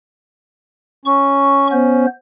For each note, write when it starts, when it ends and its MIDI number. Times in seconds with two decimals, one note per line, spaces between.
1.05 2.06 61
1.05 1.67 85
1.72 2.06 59
1.72 2.06 72